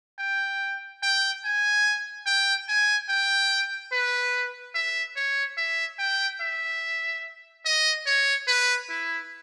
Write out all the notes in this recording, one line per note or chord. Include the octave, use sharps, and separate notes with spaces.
G5
G5
G#5
G5
G#5
G5
B4
E5
C#5
E5
G5
E5
D#5
C#5
B4
E4